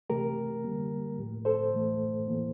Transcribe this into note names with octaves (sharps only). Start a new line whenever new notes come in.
C3 E3 A3 G4 A#4
D3 G3 A#3
A2 F3 A3
A4 C5
A2 E3 A3
A2 E3 A#3